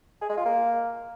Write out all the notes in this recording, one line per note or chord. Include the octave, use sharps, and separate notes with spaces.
G#4
G#3
F4
A#3